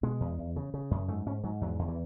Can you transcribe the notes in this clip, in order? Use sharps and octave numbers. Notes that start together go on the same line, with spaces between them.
B2 G#3
E2
E2
C#3
C#3
F#2
G#2 A3
G#2 C#4
G#2 F#3
E2 F#3
E2 D3
E3